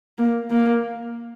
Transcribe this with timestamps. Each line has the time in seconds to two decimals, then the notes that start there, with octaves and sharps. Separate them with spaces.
0.18 A#3
0.50 A#3